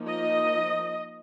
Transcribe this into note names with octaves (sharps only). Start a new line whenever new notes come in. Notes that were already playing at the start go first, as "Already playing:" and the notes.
Already playing: F3 A#3 D#4
D#5